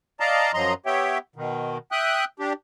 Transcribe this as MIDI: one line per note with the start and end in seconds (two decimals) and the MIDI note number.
0.20 0.52 74
0.20 0.52 75
0.20 0.52 77
0.20 0.52 81
0.20 0.52 82
0.54 0.74 42
0.54 0.74 53
0.54 0.74 54
0.54 0.74 75
0.54 0.74 82
0.54 0.74 84
0.86 1.18 59
0.86 1.18 67
0.86 1.18 73
0.86 1.18 76
0.86 1.18 79
1.36 1.78 47
1.36 1.78 51
1.92 2.25 76
1.92 2.25 79
1.92 2.25 87
1.92 2.25 90
2.40 2.53 62
2.40 2.53 67